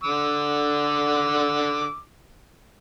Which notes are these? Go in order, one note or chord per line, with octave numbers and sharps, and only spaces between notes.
D3 D6 E6